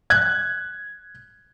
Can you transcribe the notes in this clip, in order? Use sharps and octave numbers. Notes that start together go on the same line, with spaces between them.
F#6 G#6